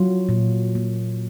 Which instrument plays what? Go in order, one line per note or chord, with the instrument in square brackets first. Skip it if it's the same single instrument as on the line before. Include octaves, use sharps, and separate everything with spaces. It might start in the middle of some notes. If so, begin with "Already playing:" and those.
Already playing: [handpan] F#3 F4
A#2
A#3